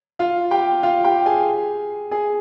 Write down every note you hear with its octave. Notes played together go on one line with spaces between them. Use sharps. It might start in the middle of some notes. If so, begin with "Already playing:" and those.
F4 F5
G4 G5
F4 F5
G4 G5
G#4 G#5
G#4 G#5